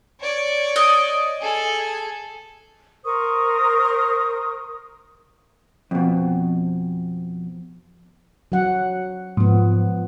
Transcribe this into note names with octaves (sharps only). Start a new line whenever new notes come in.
C#5 D5
D#5
G#4 A4
A#4 C5 C#6 D#6
F2 B2
F#3 F#5
G#2 F3 B3